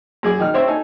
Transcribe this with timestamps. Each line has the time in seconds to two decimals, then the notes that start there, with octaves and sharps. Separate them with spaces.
0.23 F#2 G#4 D5
0.39 D#3 D#4 F6
0.54 C4 D4 C5 C#5 E5
0.67 D#4 A4 G#5